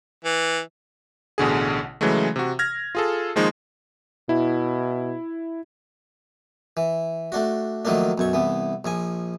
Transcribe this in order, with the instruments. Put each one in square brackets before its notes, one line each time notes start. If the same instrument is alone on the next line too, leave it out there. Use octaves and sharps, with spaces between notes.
[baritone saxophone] E3
[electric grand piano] A1 B2 D3 G#4
C#3 E3 F#3 G#3 A3
C3 F#4
F6 G#6 A#6
F4 G#4 A4
D#3 F3 G#3 A#3 D#4
[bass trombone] B2 [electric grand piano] E4
[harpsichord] E3
A3 D4 F#4
D#3 F3 F#3 A3 A#3 D4
B1 F#2 C#6
C2 E3 B3
A#1 F3 G#5